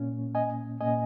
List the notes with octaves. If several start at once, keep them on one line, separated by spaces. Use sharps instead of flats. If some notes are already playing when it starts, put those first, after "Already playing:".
Already playing: A#2 A#3 C#4
D#5 G#5
A#2 A#3 C#4 D#5 G#5